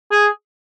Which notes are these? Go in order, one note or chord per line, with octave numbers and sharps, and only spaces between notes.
G#4